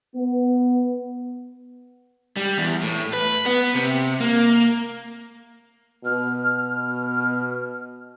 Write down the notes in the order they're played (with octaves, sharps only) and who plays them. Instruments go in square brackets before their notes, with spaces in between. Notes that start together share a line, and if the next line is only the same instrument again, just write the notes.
[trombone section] B3
[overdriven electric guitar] G3
E2
A2
B4
B3
C3
A#3
[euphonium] B2 [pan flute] F6